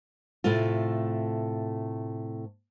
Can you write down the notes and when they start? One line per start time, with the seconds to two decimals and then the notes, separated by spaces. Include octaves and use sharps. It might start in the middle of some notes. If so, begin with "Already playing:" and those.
0.44 A2 C3 A3 F4